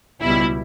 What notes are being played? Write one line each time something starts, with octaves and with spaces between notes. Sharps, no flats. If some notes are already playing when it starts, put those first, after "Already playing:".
C#2 B2 G3 E4